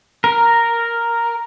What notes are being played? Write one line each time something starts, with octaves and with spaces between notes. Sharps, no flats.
A#4